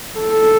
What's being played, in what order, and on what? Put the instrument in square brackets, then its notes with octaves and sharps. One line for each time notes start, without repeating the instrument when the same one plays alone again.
[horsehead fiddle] A4